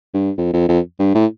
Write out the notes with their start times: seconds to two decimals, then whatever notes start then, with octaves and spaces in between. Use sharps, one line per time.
0.14 G2
0.38 F2
0.53 F2
0.69 F2
0.99 G2
1.15 A2